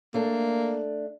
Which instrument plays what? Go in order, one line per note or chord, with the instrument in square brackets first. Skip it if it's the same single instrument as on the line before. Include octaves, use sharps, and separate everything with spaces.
[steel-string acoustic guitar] A3 D4 [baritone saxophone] A#3